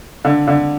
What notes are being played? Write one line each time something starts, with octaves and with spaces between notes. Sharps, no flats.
D3
D3